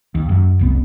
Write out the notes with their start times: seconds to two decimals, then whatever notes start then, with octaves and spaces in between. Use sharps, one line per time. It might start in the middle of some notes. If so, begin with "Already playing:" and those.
0.15 D#2
0.29 F#2
0.59 F1 C2 B3